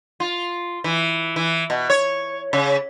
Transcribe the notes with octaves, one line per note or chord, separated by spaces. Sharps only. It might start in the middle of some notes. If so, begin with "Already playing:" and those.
F4
E3
E3
B2
C#5
C#3